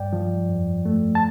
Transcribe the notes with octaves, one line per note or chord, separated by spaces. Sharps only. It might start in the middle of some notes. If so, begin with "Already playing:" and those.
Already playing: G2 D5 G5
F3
F2
A3
A5